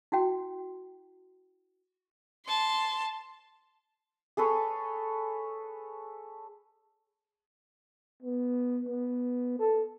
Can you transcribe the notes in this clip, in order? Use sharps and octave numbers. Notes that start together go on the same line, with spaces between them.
E4 F#4 G5
A5 C6
G#4 A4 B4 C#5
B3
B3
A4